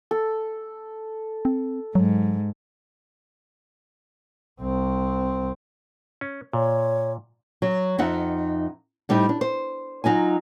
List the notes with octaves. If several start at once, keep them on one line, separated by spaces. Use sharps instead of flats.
A4
C4
G#2 F#3
C2 C4
C#4
A#2 C#5
F#3
F2 D#4 E5 F#5
A2 G3 C4 D#4
D4
C5
F#3 D#4 F4 G#5